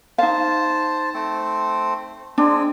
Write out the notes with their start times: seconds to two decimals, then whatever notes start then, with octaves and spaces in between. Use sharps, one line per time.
0.18 D#4 C5 F5 A5
1.14 A3 C4 C5
2.38 G#3 C4 D4